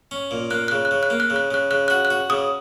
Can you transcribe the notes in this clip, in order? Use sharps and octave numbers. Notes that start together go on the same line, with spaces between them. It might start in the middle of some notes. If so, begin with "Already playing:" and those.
C#4
A#2
A#3 F#6
C#3 F#6
F#6
C#3
F#6
A#3
F#6
C#3
F#6
C#3 F#6
C#3 F#6
F#4 F#6
F#6
F#4
C#3 D#6